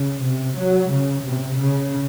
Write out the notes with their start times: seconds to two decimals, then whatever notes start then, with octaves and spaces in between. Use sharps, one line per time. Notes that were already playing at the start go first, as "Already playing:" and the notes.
Already playing: C#3
0.24 C3
0.58 F#3
0.92 C#3
1.25 C3
1.60 C#3